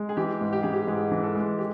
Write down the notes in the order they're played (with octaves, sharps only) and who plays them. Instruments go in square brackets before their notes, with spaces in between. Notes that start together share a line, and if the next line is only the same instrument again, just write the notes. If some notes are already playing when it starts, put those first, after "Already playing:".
Already playing: [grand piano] G#3
[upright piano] G#4
[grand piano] E3 [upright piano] G4
[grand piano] G#2
[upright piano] G4
[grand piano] E3 [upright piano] G#4
[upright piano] G4
[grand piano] G#2 [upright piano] G#4
[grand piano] E3
[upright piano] A4
[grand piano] G#3
[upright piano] G4